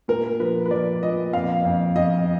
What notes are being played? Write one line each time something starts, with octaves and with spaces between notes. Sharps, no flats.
A#2 A#4
F3 B4
B4
F3 D5
A#2 D#5
F2 F5
F2
F2 D#5